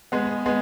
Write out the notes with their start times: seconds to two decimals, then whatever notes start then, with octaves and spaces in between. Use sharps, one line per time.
0.12 G#3 B3
0.46 G#3 B3